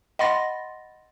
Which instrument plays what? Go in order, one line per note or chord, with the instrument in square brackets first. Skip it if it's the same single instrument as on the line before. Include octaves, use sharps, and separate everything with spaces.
[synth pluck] D#5 F#5 B5 C6 A6 A#6